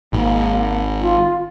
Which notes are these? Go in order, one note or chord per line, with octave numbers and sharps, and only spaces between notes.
G#1 A#3
F4